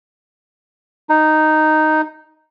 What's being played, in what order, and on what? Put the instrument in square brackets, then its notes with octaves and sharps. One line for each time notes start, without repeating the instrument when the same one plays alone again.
[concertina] D#4